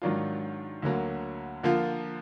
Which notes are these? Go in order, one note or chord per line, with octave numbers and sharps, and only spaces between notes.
G#2 D#3 F#3 D4 F4
D2 D3 F#3 A#3
D3 F3 A#3 F4